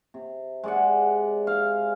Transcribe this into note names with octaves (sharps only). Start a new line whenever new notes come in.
C3
G#3 D5 F#5
F5